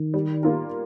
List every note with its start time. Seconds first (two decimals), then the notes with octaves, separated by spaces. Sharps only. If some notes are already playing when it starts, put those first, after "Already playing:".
Already playing: D#3
0.14 G3
0.43 A#3 F4 A#4